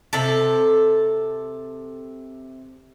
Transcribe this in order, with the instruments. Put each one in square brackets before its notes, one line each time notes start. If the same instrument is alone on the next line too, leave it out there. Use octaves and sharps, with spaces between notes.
[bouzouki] C3 A4